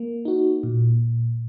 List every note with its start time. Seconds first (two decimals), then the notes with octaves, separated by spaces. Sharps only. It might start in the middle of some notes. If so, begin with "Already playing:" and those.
Already playing: A#3
0.25 D#4 F#4
0.63 A#2